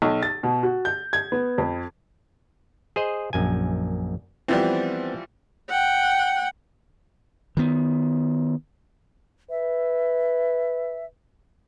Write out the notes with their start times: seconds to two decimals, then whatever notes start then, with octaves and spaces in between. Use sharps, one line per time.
0.02 B1
0.23 A6
0.43 B2
0.63 F#4
0.85 G6
1.13 G#6
1.32 B3
1.58 F2
2.96 G#4 C5 D#5
3.33 A#1 F#2 G#5
4.48 E3 F3 G3 B3 C4
5.69 F#5 G5
7.57 D#3 B3
9.50 B4 E5